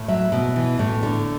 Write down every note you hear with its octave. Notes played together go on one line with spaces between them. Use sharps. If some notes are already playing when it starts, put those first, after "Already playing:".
Already playing: A2
F#3 E5
B2
E3
A2
D3